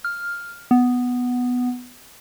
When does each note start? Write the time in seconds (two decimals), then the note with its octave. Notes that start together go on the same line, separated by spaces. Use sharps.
0.05 F6
0.71 B3